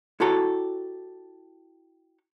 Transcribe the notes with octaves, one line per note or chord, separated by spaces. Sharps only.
E4 F#4 G4 A4 C#5 A#5